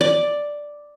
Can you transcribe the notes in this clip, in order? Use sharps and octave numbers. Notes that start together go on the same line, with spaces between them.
D5